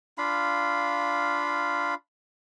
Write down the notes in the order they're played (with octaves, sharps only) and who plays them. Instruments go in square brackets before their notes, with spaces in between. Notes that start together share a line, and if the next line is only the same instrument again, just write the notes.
[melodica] D4 F4 F5 B5